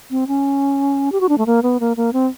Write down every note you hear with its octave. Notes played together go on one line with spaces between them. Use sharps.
C4
C#4
G4
F#4
D4
A3
A#3
B3
A#3
A#3
C4